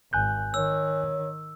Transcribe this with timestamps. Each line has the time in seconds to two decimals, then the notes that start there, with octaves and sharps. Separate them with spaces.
0.13 G#1 G#5 F#6 G6
0.54 D#3 C#5 E6